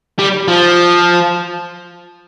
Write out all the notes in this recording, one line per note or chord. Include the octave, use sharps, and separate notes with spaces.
G3
F3